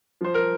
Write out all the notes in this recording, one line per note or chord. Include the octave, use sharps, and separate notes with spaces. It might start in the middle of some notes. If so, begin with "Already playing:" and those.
F3 C5
A#4